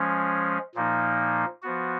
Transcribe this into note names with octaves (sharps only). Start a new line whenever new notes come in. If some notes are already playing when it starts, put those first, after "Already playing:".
Already playing: F3 G#3 C#4
A#2 F3 A#3 D#4
F3 B3 F#4